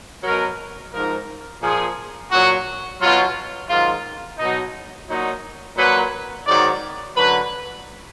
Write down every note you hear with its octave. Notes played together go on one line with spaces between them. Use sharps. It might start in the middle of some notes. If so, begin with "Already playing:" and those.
B2 F#3 A#4
G#2 F3 A#4
A#2 F3 G#4
A#2 F#3 F#4
B2 F#3 F4
G#2 D#3 F#3 F4
B2 F#3 D#4
A#2 F#3 D#4
A#2 F#3 B4
G#2 D#3 F#3 D5
F#2 D3 F#3 B4